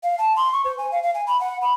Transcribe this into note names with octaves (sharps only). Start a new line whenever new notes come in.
F5
A5
C6
C#6
C5
G#5
F5
F5
G#5
B5
F#5
B5